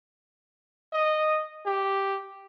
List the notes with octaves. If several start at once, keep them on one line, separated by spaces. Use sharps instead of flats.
D#5
G4